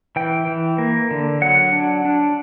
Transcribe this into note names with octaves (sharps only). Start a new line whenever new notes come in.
E3 G5
E3
A#3
D3
F#3 F#5
D4
D4